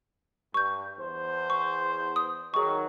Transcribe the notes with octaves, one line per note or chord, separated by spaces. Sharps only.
G2 C#6 G6
E2 C5
C#6
D#6
D#3 F#3 G#4 C#6